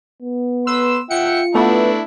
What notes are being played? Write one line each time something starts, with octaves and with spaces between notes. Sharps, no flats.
B3
B4 C6 E6
F4 E5 F#5 G5 C#7
A3 B3 D4 E4 D5